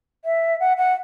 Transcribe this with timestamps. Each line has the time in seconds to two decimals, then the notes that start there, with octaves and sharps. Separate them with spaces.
0.25 E5
0.60 F#5
0.77 F#5